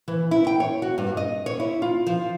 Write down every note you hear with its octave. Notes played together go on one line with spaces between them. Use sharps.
E3
E4
G5
C#5
F#4
G2
D#5
C#5
E4
F4
F3